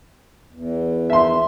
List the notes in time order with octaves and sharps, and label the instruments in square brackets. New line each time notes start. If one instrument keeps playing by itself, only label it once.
[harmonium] E2
[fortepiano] E5 C6